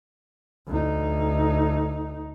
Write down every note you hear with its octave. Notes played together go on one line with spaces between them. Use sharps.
D2 D#4